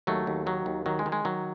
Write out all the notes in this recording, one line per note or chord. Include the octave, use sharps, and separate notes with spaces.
D#2 F#3 A3
D#2
D#3 F#3
D#2
D#3 F#3
G#3
D#3
G#3
D#3 F#3